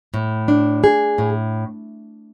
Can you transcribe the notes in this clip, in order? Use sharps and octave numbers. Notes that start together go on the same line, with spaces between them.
A2
D4
G#4
A2